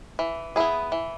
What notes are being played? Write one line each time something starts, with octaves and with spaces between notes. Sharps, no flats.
E3
B3 E4 G#4
E3